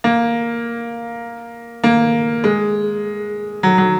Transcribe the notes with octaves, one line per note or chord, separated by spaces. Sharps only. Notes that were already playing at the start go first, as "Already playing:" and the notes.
A#3
A#3
G#3
F#3
F#3